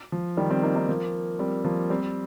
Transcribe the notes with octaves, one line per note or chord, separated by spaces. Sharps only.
F3
D#3 G3
G3 C4
A#3 D#4
A#3 D#4
F3 A#3
G3 C4
F3 A#3
G3 C4